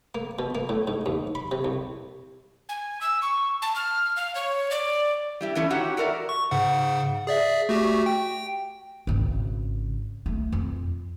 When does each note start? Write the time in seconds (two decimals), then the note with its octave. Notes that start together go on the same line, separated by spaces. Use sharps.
0.15 A#3
0.39 B2
0.55 A#3
0.69 A2
0.88 G#2
1.06 D#2
1.35 B5
1.51 C3
1.65 C2
2.69 G#5
3.01 E6
3.22 C#6
3.62 A5
3.76 F6
4.16 F5
4.35 C#5
4.71 D5
5.41 G3 E4 G4
5.55 E3 A3 C#4 D4 E4
5.70 D#4 F#4 G4 C#5 F#5
5.97 F#4 A4 A#4 D5 E5
6.29 C#6
6.51 G#2 C#3 F#5
7.27 G#4 D5 E5
7.69 A3 F#4 G4
8.06 G5
9.07 G#1 C#3
10.26 A3
10.52 F2